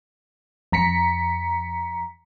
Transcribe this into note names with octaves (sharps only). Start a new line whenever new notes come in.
F2 A#5 B6 C#7